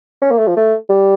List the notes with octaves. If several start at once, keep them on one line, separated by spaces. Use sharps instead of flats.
C#4
A#3
A3
F3
A3
G3